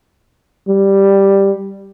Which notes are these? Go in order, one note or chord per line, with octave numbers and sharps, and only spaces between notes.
G3